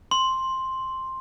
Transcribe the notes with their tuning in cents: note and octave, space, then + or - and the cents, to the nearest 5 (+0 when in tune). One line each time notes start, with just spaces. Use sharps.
C6 +5